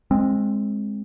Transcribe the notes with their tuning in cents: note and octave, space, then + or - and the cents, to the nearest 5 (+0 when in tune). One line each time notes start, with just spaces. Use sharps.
G#3 +0 C4 +20